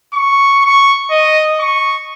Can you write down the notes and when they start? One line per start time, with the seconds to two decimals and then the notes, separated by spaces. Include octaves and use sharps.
0.14 C#6
0.65 C#6
1.11 D#5
1.60 C#6